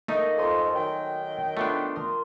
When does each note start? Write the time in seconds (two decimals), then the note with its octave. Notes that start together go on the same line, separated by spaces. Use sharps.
0.08 A3 A#3 D#4 D#5
0.37 F2 G#5 C6 D#6
0.75 D#3 F#3 G5
1.57 A3 B3 D4 F4
1.96 A#4 C6 D#6